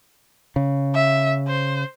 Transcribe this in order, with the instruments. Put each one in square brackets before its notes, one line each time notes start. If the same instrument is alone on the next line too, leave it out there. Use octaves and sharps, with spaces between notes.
[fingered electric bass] C#3
[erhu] E5
C5